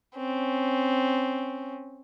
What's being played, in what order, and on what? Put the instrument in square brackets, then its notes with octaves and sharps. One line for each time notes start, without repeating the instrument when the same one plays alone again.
[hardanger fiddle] C4 C#4